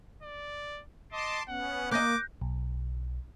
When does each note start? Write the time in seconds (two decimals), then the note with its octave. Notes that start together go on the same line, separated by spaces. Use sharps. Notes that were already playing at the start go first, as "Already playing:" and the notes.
0.22 D5
1.12 D#5 A5 C6 D6
1.48 B3 C#4 F#5
1.91 A#3 D#5 D6 F#6 G6 A#6
2.42 B1